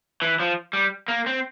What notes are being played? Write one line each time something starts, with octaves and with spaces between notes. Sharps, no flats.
E3
F3
G3
A#3
C4